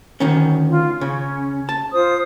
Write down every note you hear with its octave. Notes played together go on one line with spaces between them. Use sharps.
D2 D#3 C#4
F4
C#3 C#4
A5
F4 C5 D#6